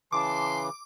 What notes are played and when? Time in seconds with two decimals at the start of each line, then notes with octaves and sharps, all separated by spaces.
0.12 C#3 E3 A5 C6 D6